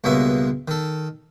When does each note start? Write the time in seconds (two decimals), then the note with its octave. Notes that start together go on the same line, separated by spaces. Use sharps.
0.04 C#2 G2 B2 G#3 A#3 E5
0.68 D#3 A4